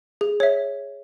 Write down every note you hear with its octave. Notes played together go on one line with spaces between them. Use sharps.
G#4
C#5 E5